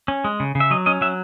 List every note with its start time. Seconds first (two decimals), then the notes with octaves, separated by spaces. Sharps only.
0.08 C#4
0.24 G#3
0.40 C#3
0.55 C#3
0.60 E5
0.71 F#3 D#5
0.86 C#4 D#5
1.01 F#3 E5